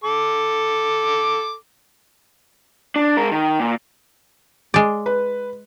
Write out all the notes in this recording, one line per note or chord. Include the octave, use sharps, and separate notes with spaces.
A4 D6
D4
G#3 A#4
D#3
A#2
G#3 D5
B4